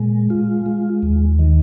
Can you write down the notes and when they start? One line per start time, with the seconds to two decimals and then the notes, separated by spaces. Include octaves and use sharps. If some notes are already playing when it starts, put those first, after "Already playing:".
Already playing: A#2 G#3
0.30 F4
0.66 G#3
1.03 D#2
1.39 D#3